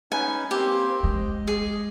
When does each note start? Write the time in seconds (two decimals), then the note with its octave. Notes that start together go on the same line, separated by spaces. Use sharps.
0.12 C#4 D#4 B4 G#5
0.51 A#3 C4 G4 C5
1.03 G#3 D#5
1.47 G#4